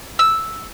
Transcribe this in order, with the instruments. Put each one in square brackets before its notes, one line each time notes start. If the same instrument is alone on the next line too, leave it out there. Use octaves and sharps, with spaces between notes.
[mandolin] E6